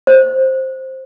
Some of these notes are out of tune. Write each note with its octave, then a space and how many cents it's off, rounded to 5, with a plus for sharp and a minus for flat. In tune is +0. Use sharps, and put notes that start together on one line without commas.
C5 +10